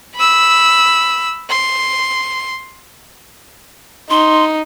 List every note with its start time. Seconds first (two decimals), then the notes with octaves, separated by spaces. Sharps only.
0.16 B5 E6
1.50 C6
4.10 D#4 C6